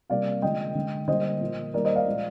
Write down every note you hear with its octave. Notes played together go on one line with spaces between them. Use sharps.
C3 G3 A#3 D5 F5
D3 F3 G#3 D#5 G5
D3 G#3
D3 G3 A#3 C5 D#5
A#2 F3 A#3
D#3 G3 A#3 A#4 D5
C5 D#5
D5 F5
A#2 F3 G#3